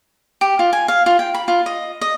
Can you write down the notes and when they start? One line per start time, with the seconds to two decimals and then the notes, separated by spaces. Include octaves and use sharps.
0.41 G4
0.59 F4
0.73 G#5
0.88 F5
1.06 F4
1.19 G5
1.34 B5
1.48 F4
1.66 D#5
2.01 D#5